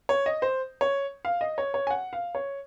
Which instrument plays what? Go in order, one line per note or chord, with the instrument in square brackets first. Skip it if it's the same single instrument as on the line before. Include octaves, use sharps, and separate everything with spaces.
[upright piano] C#5
D#5
C5
C#5
F5
D#5
C#5
C#5
G#5
F#5
F5
C#5